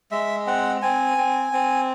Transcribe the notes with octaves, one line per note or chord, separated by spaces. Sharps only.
G#3 E5
C4 F#5
C4 G#5
C4
C4